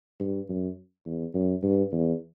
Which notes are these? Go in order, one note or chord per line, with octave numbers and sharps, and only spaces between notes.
G2
F#2
E2
F#2
G2
E2